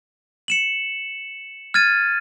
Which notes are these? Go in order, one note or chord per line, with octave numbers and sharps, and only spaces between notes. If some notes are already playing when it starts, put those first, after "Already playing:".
C#7 E7 F#7
F6 G#6 A6 D#7